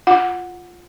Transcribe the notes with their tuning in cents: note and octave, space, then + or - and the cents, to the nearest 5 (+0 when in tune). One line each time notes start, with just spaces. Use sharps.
F4 +0 F#5 -15